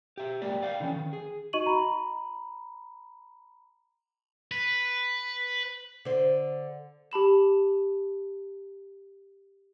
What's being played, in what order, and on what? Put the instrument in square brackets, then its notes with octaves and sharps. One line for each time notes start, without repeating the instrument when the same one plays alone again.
[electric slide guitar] G4 E5
G#3 A#3 G4 D5
D5 F5 G5
D3 E3 B3 C#4
D#3
G#4
[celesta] D#4 F#4 D#5 C#6 D#7 F#7
A#5 B5
[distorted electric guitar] B4
[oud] D3 C5
[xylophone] G4 A5 B5 E7